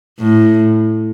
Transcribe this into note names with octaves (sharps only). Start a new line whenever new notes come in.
A2